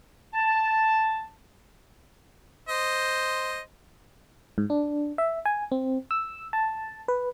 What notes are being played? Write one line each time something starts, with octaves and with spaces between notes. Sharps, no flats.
A5
C5 D#5
G#2
D4
E5
G#5
C4
E6
A5
B4